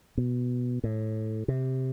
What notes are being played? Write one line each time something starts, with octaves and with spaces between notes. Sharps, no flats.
B2
A2
C3